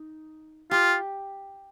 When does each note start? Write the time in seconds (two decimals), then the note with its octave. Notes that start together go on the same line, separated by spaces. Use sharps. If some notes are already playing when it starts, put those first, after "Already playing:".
Already playing: D#4
0.71 F4 G4